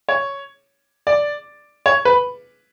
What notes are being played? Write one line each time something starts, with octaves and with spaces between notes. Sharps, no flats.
C#5
D5
C#5
B4